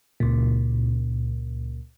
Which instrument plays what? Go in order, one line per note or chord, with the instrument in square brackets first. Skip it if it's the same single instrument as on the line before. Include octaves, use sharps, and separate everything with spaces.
[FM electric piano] C#2 A#2